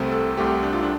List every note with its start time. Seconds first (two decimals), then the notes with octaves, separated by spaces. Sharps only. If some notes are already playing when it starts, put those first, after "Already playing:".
Already playing: C2 C3 A3 C4
0.11 A4
0.37 C2 C3 A3 C4 G4
0.63 D4
0.73 F4
0.83 D4